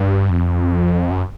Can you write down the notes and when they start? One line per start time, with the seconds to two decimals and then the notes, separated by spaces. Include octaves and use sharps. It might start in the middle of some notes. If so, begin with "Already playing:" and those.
Already playing: G2
0.30 F2
1.11 F#2